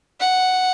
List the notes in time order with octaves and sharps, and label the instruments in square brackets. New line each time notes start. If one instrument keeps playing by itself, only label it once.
[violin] F#5